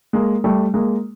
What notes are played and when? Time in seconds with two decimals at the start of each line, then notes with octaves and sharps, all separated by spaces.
0.13 G#3 A#3
0.44 G3 A3
0.74 G#3 A#3